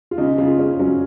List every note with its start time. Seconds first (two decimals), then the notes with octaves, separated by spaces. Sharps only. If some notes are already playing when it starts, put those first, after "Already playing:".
0.11 F4
0.18 C#3 D#4
0.38 C#3 F4
0.59 C#3 C#4
0.79 F#3 C#4